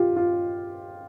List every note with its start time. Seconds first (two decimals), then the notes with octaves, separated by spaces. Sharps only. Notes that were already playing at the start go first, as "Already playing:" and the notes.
Already playing: F4 G4
0.16 F4